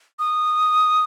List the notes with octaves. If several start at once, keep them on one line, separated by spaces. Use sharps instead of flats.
D#6